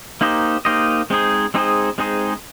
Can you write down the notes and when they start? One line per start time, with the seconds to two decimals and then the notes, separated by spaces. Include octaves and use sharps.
0.21 A#3 D#4 G4 C5 D#5
0.65 A#3 D#4 G4 C5 D#5
1.10 G#3 C4 D#4 G#4 C5
1.54 G#3 C4 D#4 G#4 C5
1.98 G#3 C4 D#4 G#4 C5